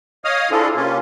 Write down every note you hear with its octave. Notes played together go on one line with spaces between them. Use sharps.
C#5 D#5 F5 D#6 F6
C4 D4 E4 F4 G#4 A4
C3 A#3 C#4 F4